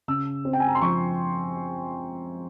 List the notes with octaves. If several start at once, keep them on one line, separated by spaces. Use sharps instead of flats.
C#3 E6
C4
G5
G#5
A#5
C6
F3 C#6